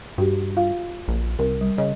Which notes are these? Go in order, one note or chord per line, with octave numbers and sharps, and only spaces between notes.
G2 F#4 G4
F4 F5
A#1
C2 A#4
G3
C#3 D#5